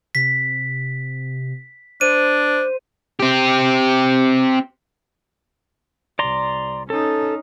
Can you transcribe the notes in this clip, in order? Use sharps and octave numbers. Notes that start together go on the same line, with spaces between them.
C3 B6
D4 C5 D#7
C4 G4
C2 D5 A#5 C6
C#4 D#4 A4